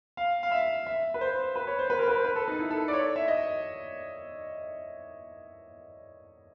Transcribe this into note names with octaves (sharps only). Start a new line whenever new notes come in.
F5
F5
E5
E5
B4
C5
B4
C#5
C5
B4
A#4
B4
C5
B4
A4
D#4
E4
A4
D5
C#5
E5
D#5